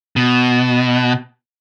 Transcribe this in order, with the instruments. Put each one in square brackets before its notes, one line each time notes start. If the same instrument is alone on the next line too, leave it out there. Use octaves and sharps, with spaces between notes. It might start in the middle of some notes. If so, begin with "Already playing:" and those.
[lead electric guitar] B2